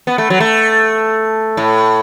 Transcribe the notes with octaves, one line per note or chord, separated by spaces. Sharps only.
B3
A3
F#3
A3
A2